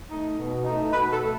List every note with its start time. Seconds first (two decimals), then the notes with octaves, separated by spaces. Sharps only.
0.09 A3 D#4
0.37 B2
0.64 A3 D#4
0.92 B2 B4
1.12 A4
1.21 A3